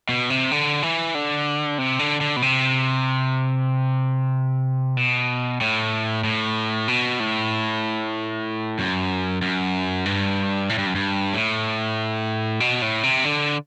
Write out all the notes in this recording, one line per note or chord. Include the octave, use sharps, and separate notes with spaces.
B2
C3
D3
E3
D3
C3
D3
D3
B2
C3
B2
A2
A2
B2
A2
F#2
F#2
G2
A2
G2
F#2
G2
A2
B2
A2
C3
D3